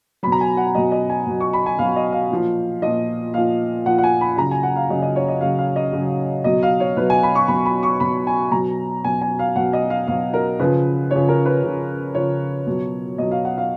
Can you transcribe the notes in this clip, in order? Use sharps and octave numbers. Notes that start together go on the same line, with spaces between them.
B2 F#3 B5
A#5
G#5
F#5
B2 F#3 D#5
D#5
G#5
B2 F#3
C#6
B5
G#5
B2 F#3 F5
D#5
F5
A#2 F3
A#2 F3 D#5
A#2 F3 F5
A#2 F3 F#5
F#5
G#5
B5
C#3 F#3 A#5
G#5
F#5
F5
C#3 F#3 D#5
D#5
C#5
D#5
C#3 F#3 F5
F5
D#5
C#3
F#3
B2 F#3 D#5
F5
C#5
B2 F#3 B4
G#5
B5
C#6
B2 F#3 B5
B5
C#6
B2 F#3 B5
G#5
B2 F#3 A#5
B2 F#3 G#5
G#5
F5
B2 F#3 F#5
D#5
F5
B2 F#3 F5
A#4
C#3 F3 B4
C#3 F3 C#5
A#4
B4
C#3 F3
C#3 F3 C#5
B2 F#3
B2 F#3 D#5
F5
F#5
F5